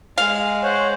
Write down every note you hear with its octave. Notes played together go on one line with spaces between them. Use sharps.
G#3 F5
C5 C#5 F#5